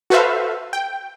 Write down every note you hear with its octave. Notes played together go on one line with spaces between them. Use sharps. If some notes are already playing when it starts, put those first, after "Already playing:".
F#4 A4 B4 C5 E5 F5
G5